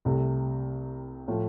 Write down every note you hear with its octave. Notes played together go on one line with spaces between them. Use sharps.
C2 C3 A3
A2 F3 A3